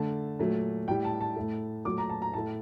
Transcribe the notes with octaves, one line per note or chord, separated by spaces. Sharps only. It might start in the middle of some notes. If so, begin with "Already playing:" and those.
Already playing: D3 A3 A5
A#2 F#3 A3
A2 G3 G5
A5
A5
A2 A3
A#2 F#3 A3 D6
A#5
A5
A#5
A2 A3 A5